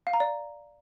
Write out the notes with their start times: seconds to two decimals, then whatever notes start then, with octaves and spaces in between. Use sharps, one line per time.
0.07 F5
0.13 A#5
0.20 D5